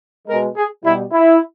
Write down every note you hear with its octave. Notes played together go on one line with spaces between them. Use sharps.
G#3 A#4
B2
G#4
B2 G3 E4
E4